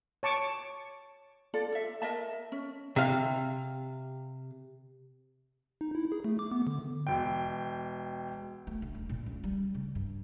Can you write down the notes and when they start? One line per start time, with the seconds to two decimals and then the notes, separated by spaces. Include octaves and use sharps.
0.23 C#5 A5 C#6 D6
1.54 F4 A4 D5
1.72 A4 E5
2.02 A#4 D#5 E5 A5
2.52 C#4
2.96 C3 F5
5.81 D#4
5.95 E4
6.12 G#4
6.25 A3
6.39 D6
6.51 B3
6.67 D3
7.07 E1 G5
8.67 A3
8.82 D3
8.95 D#1
9.09 A#2
9.26 C#2
9.44 G3
9.74 C#3
9.95 G2